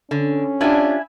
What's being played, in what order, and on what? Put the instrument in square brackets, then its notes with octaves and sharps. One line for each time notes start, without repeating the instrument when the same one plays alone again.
[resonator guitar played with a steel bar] D3 [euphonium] C#4
[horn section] D4 [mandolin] E4 E5 G#5 [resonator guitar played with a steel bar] F4 G4